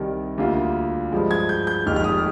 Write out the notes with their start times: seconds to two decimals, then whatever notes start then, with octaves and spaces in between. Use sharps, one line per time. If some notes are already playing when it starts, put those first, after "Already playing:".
Already playing: C2 C3 D#3 G3
0.38 D2 D3 G3 A#3 F4
1.12 G2 F3 G#3
1.31 G#6
1.49 G6
1.67 G6
1.86 F1 D#2 D#3 G#3 D#4 F6
1.96 F6
2.04 D#6